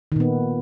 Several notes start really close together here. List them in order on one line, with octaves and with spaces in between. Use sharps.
D#3 A#2 B3